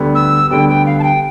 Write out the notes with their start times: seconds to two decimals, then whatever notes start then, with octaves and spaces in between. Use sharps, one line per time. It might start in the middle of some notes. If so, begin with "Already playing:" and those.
Already playing: D2 D3 G3 B3
0.15 E6
0.50 D2 D3 G3 B3 G5
0.69 G5
0.86 F5
0.99 A5
1.03 G5